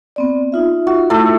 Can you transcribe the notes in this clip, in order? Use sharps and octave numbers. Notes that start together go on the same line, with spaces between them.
B3 C4 D5
D#4 F4 E5
F#4
A2 A4